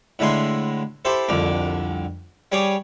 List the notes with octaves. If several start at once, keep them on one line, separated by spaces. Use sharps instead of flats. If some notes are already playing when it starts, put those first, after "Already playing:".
A2 D3 G#3 E4 G#5 C6
E4 G4 A4 C5
C2 F2 D3 D6
G3 G#4 C#5 G#5 D6